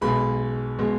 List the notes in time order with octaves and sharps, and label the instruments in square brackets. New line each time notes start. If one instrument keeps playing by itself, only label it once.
[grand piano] B1 B2 G#3 B5
B2 G#3